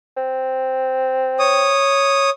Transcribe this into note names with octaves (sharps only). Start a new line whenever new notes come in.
C4
C#5 D#6